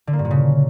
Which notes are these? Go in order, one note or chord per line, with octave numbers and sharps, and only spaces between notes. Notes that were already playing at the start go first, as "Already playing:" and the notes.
D3
A#3
G2
A#2
C#3